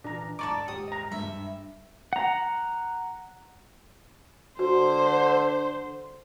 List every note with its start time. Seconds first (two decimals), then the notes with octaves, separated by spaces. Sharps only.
0.04 A#2 E3 D4 A#5
0.39 D1 G#2 A4 D5 D#5 A#5 C#6 D6
0.68 D#1 G#2 G4 D#6
0.88 D#5 A#5
1.12 G2 E5
2.13 F#5 A#5
4.59 D3 F#4 C5